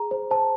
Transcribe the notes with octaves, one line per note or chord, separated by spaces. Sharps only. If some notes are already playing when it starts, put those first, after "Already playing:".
Already playing: G#4 A#5
C5
C5 A5